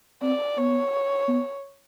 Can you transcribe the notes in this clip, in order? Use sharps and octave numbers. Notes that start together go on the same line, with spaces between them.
C4 D5
B3 C#5
B3